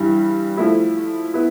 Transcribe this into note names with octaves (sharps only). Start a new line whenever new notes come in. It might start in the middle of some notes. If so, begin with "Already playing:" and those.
Already playing: G2 E3 G3
F3 A3 E4
B3 E4